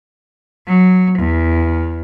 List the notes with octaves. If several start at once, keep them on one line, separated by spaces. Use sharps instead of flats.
F#3
E2